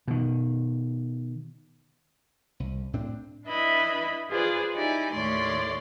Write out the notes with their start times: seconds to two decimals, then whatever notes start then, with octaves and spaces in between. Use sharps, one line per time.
0.08 B2 D#3
2.60 C2
2.93 A2 C4 D4
3.47 D4 E4 B4 D#5 E5 B5
4.29 F4 G#4 B4 C5 D5
4.75 D#4 E4 G4 D5 G#5
5.12 D#2 A2 A3 C#5 D5 C6